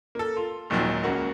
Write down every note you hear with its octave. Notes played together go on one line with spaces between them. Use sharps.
A#3 A4
F4
G#1 D#2 A#2 D#3 F3 F#3
C#2 A#3 C#4 F#4